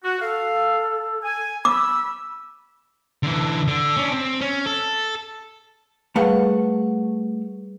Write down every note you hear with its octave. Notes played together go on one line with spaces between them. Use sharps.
F#4
A4 F5
G#5
B5 D6 E6
D3 E3
D3
C#4 D4
C4
C#4
A4
G3 A3 G#4 B4 F5 F#5